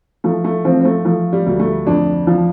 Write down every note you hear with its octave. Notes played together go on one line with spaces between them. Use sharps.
F3 A3
A3
F3 C4
C4
A3
F3 A3
G3
D2
A3
F2 D4
F3